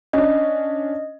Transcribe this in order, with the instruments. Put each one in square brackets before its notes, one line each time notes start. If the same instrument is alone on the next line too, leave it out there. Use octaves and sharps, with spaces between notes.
[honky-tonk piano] C#4 D4 [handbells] D#5